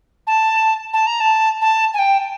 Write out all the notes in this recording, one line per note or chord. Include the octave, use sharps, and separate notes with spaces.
A5
A5
A#5
A5
A5
G#5
G5